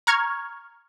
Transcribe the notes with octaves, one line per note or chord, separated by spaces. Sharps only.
A#5 C#6 F6 G#6